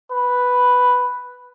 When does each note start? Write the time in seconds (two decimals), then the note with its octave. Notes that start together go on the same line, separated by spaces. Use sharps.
0.12 B4